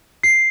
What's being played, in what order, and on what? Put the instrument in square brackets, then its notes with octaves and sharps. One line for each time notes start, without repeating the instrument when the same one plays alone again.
[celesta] C7